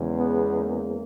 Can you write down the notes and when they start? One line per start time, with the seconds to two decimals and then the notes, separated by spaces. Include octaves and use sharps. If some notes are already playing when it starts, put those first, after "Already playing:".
Already playing: E2 C#3 G#3
0.17 B3
0.60 A#3